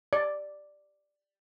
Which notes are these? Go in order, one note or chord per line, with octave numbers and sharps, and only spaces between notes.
D5